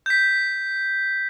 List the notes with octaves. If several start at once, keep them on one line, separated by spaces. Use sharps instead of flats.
G6 B6